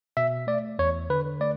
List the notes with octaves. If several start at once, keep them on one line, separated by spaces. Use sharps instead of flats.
B2 E5
A3 D5
E2 C#5
D3 B4
A3 D5